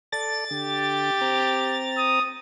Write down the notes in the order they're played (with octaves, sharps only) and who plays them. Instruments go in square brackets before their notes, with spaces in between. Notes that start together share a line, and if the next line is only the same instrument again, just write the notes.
[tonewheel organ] A4 D5 [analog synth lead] A6
[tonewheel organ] D3 [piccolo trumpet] G4
[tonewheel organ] C4 A#5
[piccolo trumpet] D#6